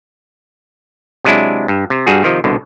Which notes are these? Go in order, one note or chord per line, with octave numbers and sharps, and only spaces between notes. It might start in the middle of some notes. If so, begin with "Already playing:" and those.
C3 F#3 G#3 D4 E4
G2
C3
G2 G3 F#4 G#4
C3 D#3 F3
C2 B2 D3